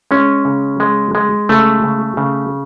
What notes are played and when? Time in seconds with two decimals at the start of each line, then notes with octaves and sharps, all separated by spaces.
0.11 G#3 C#4
0.45 C#3
0.80 G#3
1.15 G#3
1.49 C#3 A3
1.83 C#3
2.17 C#3